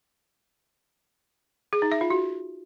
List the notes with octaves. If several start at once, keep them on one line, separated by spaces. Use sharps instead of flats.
G#4
D#4
E5
F4
F#4